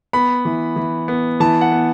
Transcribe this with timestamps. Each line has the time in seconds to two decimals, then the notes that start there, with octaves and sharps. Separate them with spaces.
0.13 B3 B5
0.45 E3
0.76 E3
1.08 B3
1.40 E3 A5
1.61 F#5
1.72 B3